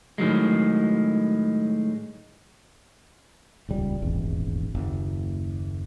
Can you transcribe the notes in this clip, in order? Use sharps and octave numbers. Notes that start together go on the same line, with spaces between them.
A2 D#3 F#3 G#3
D#1 C#2 G3
D#1 G#1 E2
F#1 D#2